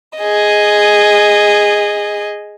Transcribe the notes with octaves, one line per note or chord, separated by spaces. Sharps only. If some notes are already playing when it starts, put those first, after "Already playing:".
G#4 D#5